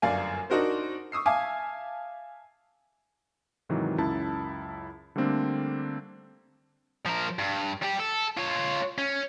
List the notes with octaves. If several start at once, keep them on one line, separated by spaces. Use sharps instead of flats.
G1 F#2 D5 F5 G#5
D4 D#4 F#4 A#4 C5
C#6 D#6 E6 C7
E5 F5 G#5 A5 D6 D#6
G#2 C3 D#3 E3 F#3
C#2 F#2 E4 A5
D3 G3 A3 A#3 C4 D4
F3 A#4
G2
G3 G4
A4
F4 C#5
C#4